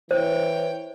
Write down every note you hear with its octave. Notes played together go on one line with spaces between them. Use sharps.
E3 C5 C#5 G5